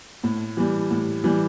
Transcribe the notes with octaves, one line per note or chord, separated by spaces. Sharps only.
A2
E3 G3
A2
E3 G3